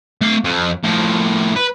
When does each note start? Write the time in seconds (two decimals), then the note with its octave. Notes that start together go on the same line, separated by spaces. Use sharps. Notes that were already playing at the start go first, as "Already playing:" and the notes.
0.21 A3 F5
0.44 F2
0.83 A2 F3
1.56 B4